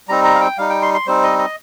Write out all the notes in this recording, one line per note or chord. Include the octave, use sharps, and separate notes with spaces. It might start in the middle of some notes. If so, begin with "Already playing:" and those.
G3 C4 D#4 A#5
A#5
F5
G5
G3 D#4 F5
G5
C6
C6
G3 C4 D#4 C5
D#5
D#5